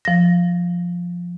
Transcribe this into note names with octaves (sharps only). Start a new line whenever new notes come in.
F3 A#6